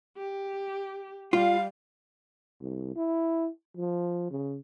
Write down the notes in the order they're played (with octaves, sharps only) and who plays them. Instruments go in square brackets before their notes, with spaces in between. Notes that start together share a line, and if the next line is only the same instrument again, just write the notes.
[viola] G4
[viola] G3 [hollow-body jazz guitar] F4 [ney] F5
[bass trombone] C2
E4
F3
C#3